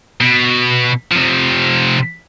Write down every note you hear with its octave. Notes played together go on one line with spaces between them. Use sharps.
B2
C3 F3